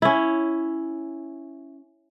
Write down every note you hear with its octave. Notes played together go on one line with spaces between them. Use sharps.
C#4 E4